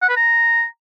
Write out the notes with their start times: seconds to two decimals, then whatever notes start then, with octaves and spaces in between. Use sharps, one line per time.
0.02 F#5
0.09 B4
0.17 A#5